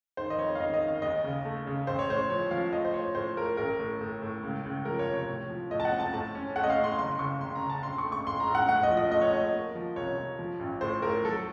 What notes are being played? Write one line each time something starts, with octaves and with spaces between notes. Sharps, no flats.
D#3 C5
D#5
F2 C#5
F5
D#3 D#5
D#5
D#3
F5
D#2 D#5
C#3
A3
C#3
A1 C5
C#5
A2 C5
F3 C#5
F3 F5
A3 D#5
C5
A2 C#5
A2 C5
A3 A#4
A1 A#4
A2
A2
A2
C#2
C#2
F3 A#4
C#5
C3
C#5
A2
F3
A2 D#5
A5
F#5
C4
A5
A2 A5
C#4
A3 F#5
D#5
F5
A2
C6
F#1 C6
C#3 C#6
F#1 C6
A#5
C#3
A5
A#1 C6
C#6
A3
C#6
A2 C6
A#5
A#1
F#5
A2 F#5
D#5
F3
D#5
A3 D#5
C#5
A3 D#5
A#3
F3
C2 C#5
F3
F3
A1
A2 C5
A2 A#4
F#3 A4